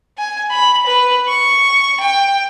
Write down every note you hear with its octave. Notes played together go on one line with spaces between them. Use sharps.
G#5
B5
B4
C#6
G5